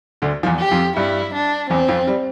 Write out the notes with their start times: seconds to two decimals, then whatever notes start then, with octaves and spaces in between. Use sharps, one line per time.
0.22 D2 D3
0.43 F3
0.46 E2 E3
0.59 G4
0.71 F2 F3
0.96 G2 G3 E4
1.34 D4
1.70 E2 E3 C4
1.88 F2 F3
2.07 G3